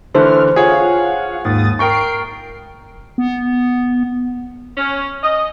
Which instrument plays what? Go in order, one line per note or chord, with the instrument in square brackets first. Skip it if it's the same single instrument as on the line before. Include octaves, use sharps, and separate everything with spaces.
[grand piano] D3 E3 A3 [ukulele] C5 [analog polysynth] F6
[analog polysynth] F4 F5 F#5 [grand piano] G#4 C#5
[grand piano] D#2 [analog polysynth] G#2 D#6 A6
[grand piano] A#4 G5 C#6 [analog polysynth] C7 D7
[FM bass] B3
[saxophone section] C#4
D#5